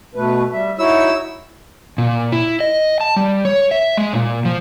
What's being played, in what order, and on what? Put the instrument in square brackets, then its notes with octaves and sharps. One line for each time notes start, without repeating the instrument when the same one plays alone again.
[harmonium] B2 A3 B4
G3 E5
[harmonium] D#4 F#4 C#5 [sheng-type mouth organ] E4 E6
[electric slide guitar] A#2
E4
D#5
A5
G3
C#5
E5
G#3
A#2
F3